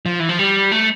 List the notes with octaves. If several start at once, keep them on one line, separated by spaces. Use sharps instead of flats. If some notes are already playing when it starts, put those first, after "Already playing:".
F3
E3
F3
G3
A3